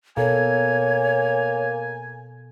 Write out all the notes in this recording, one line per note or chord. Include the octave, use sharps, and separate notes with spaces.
B2 A#3 A4 C#5 G#5